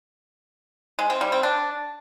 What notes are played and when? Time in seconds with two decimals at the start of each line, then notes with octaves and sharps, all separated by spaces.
0.99 G#3
1.10 C4
1.21 G3
1.32 C4
1.43 D4